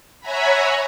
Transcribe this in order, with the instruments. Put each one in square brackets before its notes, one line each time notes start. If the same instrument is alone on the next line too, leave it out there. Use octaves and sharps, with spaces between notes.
[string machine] C#5 E5 F#5 G#5 A#5 B5